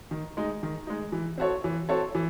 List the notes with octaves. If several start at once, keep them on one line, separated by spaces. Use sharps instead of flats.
D#3
G#3 D#4
D#3
G#3 D#4
E3
C4 F#4 A4 C#5
E3
C4 F#4 A4 C#5
E3